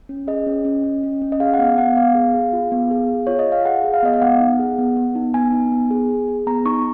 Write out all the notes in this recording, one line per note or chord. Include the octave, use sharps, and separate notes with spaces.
C#4
G#4 D#5
C#4
C#4
C#4
C#4
C#4
D#5
G#4 F5
F#5
B3 F5
B3 F#5
B3 F5
G#4
G#4
F4
B3
G#4
G#4
F4 C#5
D#5
F4 F5
G#4 F#5
G#4
F5
B3 D#5
F5
B3 F#5
D#4
G#4
B3
B3
D#4
B3 G#5
D#4
B3
G#4
G#4
G#4
B3 A#5
D#4 C#6